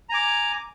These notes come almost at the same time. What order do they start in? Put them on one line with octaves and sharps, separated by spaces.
A#5 G#5 D6